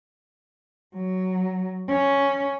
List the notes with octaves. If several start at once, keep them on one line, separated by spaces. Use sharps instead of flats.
F#3
C#4